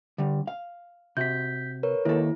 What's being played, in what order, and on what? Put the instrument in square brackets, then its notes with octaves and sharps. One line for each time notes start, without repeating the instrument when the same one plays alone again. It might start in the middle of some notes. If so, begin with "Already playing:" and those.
[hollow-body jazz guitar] D3 G3
F5
[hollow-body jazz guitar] C3 F#4 [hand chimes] G6 B6
[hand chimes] A#4 B4 C#5
[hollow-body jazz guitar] D#2 A4 [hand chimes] E4